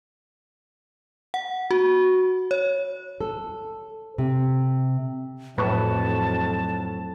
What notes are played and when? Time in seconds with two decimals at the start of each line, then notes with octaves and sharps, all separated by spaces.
1.34 F#5
1.71 F#4
2.51 C#5
3.21 A4
4.18 C3
5.58 F2 A2 F#3 B4 A5 C#6